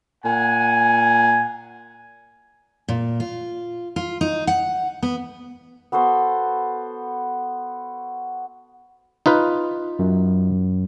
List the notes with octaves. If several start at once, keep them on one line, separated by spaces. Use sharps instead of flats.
A#2 F#5 G#5
A#2
F4
F4
D#4
F#5
B3
B3 F#4 A4 C5
D#4 F4 B4
F#2